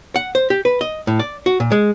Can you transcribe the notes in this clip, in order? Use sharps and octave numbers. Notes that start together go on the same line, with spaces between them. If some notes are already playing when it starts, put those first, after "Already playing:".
F#5
C5
G4
B4
D#5
A2
D5
F#4
A#2
G#3